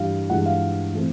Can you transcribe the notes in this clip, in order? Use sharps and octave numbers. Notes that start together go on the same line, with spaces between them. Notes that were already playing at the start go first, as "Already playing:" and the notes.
Already playing: G2 E3 G3 F5
G2 E3 G#3 F#5
F5
A2 E3 A3 C4